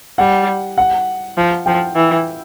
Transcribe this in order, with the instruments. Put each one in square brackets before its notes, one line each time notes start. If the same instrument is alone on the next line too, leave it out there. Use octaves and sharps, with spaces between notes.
[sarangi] G3 [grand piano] F#5
[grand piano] F#5
[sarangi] F3
[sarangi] F3 [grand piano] G5
[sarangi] E3